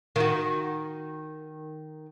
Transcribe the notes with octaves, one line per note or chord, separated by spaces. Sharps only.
D#3 F#4